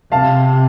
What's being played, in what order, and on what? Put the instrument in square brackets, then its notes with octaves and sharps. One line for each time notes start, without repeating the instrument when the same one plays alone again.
[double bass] C3 [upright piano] F5 A5